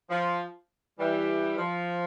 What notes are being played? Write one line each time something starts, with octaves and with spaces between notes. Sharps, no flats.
F3
E3 G3
F3